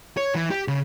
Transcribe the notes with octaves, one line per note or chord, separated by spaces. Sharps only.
C#5
E3
G4
C#3